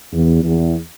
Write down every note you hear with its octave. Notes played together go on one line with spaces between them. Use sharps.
E2
E2